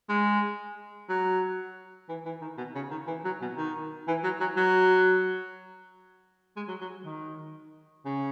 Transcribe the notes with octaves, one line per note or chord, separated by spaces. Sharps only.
G#3
F#3
E3
E3
D#3
B2
C#3
D#3
E3
F#3
B2
D#3
E3
F#3
F#3
F#3
G#3
F#3
F#3
D#3
C#3